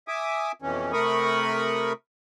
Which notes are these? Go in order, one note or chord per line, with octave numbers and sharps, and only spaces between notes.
E5 G#5 D6 D#6
F2 B2 E3 C#4
C3 A3 A#4 B5 C#6 D#6